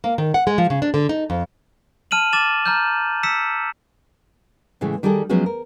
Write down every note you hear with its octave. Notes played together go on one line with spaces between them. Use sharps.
A#3
D#3
F#5
G#3
F3
C#3
D4
D3
D#4
F2
A5 F6 D#7 E7 F#7
D6 A6 E7 F#7
A#5 F6 G6
E6 B6 C#7 E7
A2 C#3 E3 G#3
D#3 G3 D#4 G#4 A4
F3 F#3 G#3 B3 C#4 F#4
A#4